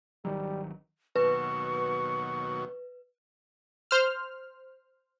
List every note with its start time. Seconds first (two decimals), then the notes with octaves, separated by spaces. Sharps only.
0.25 G#1 D#3 F#3 G3
1.16 D#2 B2 F#3 B4 C#6
3.91 C5 F6